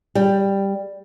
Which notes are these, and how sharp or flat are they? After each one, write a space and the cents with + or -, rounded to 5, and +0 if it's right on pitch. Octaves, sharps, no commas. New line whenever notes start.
G3 +5